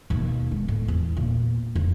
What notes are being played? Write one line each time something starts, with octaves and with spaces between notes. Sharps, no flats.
D#2 B2
G#3
A2
E2
A#2
F2